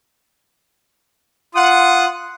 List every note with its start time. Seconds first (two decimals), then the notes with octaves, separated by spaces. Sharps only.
1.55 F4 F#5 D#6